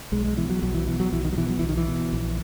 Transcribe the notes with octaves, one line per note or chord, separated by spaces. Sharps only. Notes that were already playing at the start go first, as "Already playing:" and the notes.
B1 G#3
G#3
B2 E3
F#3
B1 F#3
E3
B2 E3
F#3
B1 E3
D#3
F#3
B2 E3
F#3
B1 E3
D#3
E3
B2
A#1